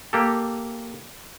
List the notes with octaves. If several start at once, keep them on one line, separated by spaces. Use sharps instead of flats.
A#3 G4 A4